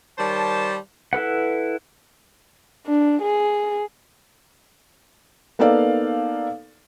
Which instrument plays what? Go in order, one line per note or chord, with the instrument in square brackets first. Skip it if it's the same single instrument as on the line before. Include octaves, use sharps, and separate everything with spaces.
[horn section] D#3 G3 C5 C#5 A5
[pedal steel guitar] E4 A4 B4 F#5
[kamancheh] D4
G#4
[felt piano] A#3 B3 D#4 A4 D5 F5